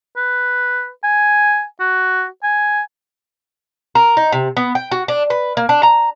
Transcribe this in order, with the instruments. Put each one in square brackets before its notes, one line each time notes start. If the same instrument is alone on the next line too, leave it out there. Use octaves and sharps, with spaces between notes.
[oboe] B4
G#5
F#4
G#5
[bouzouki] A#4
D#4
C3
B3
G5
F#4
D4
B4
A#3
D4
A#5